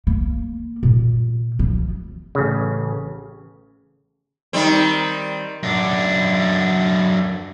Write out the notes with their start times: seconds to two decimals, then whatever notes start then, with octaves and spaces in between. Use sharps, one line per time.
0.07 A#3
0.83 A#2
1.59 F3
2.35 A1 C#3
4.53 D#3 G3 C4
5.63 F#2 D4